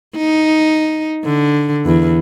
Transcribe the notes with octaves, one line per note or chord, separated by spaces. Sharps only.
D#4
D3
E2